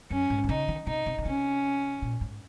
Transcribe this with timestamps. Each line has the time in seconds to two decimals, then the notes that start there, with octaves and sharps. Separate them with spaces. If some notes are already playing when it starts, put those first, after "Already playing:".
0.10 F#2 C#4
0.30 G#2
0.44 D#3
0.49 C#3 D#4
0.68 D#3
0.87 C3 D#4
1.06 C3
1.18 C#3
1.25 C3 C#4
2.02 A#2
2.21 G#2